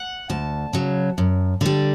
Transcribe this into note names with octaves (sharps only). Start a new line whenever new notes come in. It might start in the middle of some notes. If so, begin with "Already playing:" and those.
Already playing: F#5
D2 A5
C#3 F#3
F#2
D3 G3